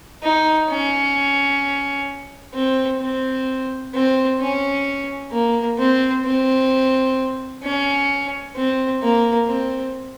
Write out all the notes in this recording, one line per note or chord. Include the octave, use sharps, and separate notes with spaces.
D#4
C#4
C4
C4
C4
C#4
A#3
C4
C4
C#4
C4
A#3
C4